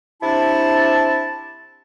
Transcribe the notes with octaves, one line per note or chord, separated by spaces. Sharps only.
C3 D4 E4 A5